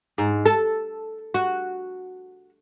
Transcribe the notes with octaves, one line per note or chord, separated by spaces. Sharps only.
G#2
A4
F#4